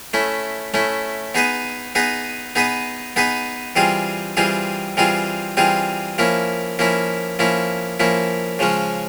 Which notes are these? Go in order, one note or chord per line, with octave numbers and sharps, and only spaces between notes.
A3 C#4 E4
A3 C#4 E4
B3 D#4 G#4 B4 D#5
B3 D#4 G#4 B4 D#5
B3 D#4 G#4 B4 D#5
B3 D#4 G#4 B4 D#5
E3 G3 C4 F4 G#4
E3 G3 C4 F4 G#4
E3 G3 C4 F4 G#4
E3 G3 C4 F4 G#4
F3 A#3 C#4 E4
F3 A#3 C#4 E4
F3 A#3 C#4 E4
F3 A#3 C#4 E4
C#3 F3 G#3 C#4